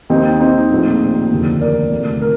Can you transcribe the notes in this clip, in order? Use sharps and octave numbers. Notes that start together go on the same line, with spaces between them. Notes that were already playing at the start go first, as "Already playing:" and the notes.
D#2 D#3 C4 D#4
C4 D#4
A#1 A2 F3
F1 D#2 D3 F3
A#4 D5
D2 C3 D#3
A#4